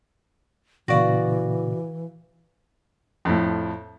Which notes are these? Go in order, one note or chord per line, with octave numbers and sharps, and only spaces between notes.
A#2 C#3 E3 F#4 D5 F5 C#6 A#6
F2 A2